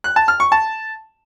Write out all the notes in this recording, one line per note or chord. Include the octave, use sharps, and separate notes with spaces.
F#6
A5
F6
C#6
A5